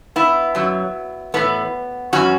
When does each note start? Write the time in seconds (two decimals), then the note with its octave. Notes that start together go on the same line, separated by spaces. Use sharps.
0.16 B3 E4
0.55 F#2 F#3
1.34 A2 E3 B3
2.13 F#2 E3 C#4 F#4